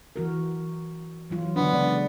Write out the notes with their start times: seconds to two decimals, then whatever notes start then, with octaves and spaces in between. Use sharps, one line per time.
0.16 E3 F#4 A#4
1.30 E3 F#3 F4
1.56 D3 B3 D4
1.73 C#3 G#3 D5